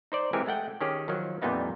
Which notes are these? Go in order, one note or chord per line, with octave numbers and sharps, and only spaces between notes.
D#4 C5 D5
E3 G#3 C4 G4 A#4 G#5
G#3 A3 F#5 G5
D#3 C#4 G4 G#4
D#3 F3 F#3
F2 A#2 G3 B3 D#4 E4